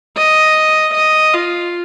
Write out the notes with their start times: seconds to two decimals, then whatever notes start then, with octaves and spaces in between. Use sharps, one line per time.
0.17 D#5
0.94 D#5
1.34 F4